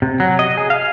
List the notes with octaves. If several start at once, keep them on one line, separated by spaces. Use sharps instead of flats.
C3
F#3
D#5
G#4
F5